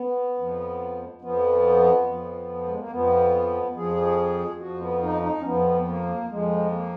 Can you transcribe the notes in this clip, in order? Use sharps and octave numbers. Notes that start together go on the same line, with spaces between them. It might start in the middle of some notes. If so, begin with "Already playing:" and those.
Already playing: B3
F2 F3
F2 F3 B3
F2 F3
G#3
A#3
F2 F3 B3
F2 F3 G#4
F2 F3 F#4
B3
D#4
D#4
C#4
F2 F3 B3
B3
A#3
F2 F3 G#3
A#3